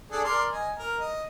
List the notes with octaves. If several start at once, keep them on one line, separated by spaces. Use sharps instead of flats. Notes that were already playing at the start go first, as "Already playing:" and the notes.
D4 G#4 A4
A#4 D5 C6
D#5 G#5
A#4
D#5